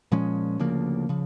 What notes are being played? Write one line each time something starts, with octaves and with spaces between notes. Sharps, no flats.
A#2 F3 G#3 C#4
D2 C#3 F3 A#3
C#3 F3